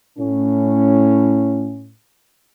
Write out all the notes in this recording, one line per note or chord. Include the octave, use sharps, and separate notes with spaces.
A2 C#4